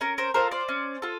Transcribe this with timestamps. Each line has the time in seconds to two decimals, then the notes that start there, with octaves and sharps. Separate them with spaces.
0.01 C#4 A#4
0.18 A#4 C5
0.34 F4 A4 A#4 C5
0.51 C5 D5
0.69 C#4
1.02 F4 A4